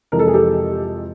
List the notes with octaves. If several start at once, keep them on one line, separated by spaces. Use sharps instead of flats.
F2 C3 E3 G#3 A#4
A4
G#4
G4 A4